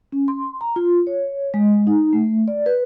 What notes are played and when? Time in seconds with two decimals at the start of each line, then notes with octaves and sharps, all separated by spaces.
0.12 C#4
0.28 C6
0.61 A#5
0.76 F4
1.07 C#5
1.54 G#3
1.87 D#4
2.13 A3
2.48 D5
2.66 B4